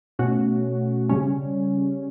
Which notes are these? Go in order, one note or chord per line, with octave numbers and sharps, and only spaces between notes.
B2 A3 C#4 F#4
C#3 G3 C#4